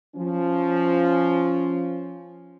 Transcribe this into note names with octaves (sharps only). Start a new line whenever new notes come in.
F3 C#4